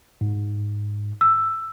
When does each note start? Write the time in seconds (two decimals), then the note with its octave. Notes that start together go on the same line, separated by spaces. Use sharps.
0.21 G#2
1.21 E6